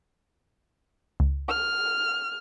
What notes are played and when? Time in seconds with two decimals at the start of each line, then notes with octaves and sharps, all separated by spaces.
1.20 C#2
1.49 F6